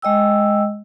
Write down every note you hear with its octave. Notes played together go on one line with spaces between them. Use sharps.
G#3 D#5 G5 E6